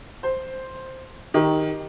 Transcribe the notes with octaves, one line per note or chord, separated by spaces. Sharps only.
C5
D#3 G4